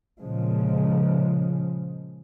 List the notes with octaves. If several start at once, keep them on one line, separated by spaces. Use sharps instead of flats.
A#2 C#3 F3 G#3